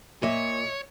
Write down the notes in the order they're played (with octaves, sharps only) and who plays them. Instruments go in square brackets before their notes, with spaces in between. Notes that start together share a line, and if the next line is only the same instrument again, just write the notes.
[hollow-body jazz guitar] A#2 [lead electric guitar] C#5 [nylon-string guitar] D#5 E5